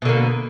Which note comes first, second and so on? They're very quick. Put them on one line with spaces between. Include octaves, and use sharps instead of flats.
B2 D3 A#3